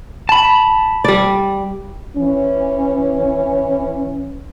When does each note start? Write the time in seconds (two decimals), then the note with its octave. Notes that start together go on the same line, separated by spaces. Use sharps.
0.29 A5 B5
1.04 G3 D5
2.17 E3 C#4